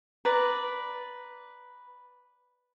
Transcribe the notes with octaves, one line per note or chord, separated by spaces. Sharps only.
B4 D5 A#5